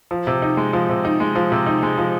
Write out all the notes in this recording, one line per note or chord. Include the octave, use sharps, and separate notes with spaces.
F3
C3
D#4
G#3
F3
C3
D#4
G#3
F3
C3
D#4
G#3
F3